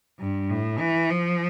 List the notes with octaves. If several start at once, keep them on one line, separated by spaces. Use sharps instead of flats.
G2
A2
E3
F3